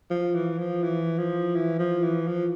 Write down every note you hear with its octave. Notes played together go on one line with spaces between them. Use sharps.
F3
E3
F3
E3
F3
E3
F3
E3
F3